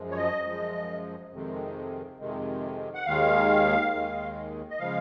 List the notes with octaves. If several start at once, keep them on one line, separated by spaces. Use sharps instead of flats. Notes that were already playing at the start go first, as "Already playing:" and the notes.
Already playing: F#2 F3 G#3
C#5
D#5
F#2 F3 G#3
F2 C3 D#3 G#3
F2 C3 D#3 G#3
F#5
D#2 D#3 G#3 F5
D#2 D#3 G#3
D#5
C#3 F3 G#3 F5